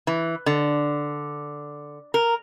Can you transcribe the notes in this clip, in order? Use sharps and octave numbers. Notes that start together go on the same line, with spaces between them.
E3
D3
A#4